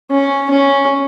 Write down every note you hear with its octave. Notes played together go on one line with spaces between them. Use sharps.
C#4
C#4